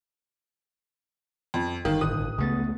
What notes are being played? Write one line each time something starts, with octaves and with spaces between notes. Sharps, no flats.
F2
G1 D#3 F5
A1 D#6 F#6
C#2 C#3 A3 B3 A6